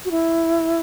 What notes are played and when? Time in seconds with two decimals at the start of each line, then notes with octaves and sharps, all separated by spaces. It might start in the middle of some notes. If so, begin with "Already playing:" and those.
0.05 F#4
0.11 E4